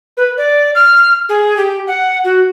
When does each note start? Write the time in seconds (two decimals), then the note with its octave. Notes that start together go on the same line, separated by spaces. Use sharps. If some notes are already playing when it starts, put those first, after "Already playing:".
0.17 B4
0.37 D5
0.75 F6
1.29 G#4
1.57 G4
1.87 F#5
2.24 F#4